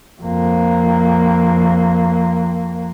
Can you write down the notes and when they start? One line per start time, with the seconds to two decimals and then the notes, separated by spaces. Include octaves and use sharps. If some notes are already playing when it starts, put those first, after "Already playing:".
0.22 F2 A#3